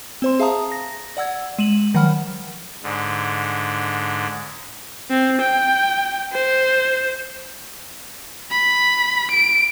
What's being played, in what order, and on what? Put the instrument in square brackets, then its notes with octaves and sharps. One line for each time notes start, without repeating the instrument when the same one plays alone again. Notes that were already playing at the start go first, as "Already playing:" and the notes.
[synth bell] C4 C5 C6
G#4 E5 F5 A5 A#5 D#6
A#6
D5 F#5 E6 G#6
G#3 D#7 E7 F#7
D#3 F3 F#3 F#5 B5 F6
[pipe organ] G#2 D3
[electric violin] C4
G5
C5
B5
D7